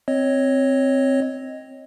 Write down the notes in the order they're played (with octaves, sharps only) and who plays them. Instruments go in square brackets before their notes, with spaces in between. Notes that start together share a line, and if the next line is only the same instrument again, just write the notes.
[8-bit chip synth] C4 C#5 D#5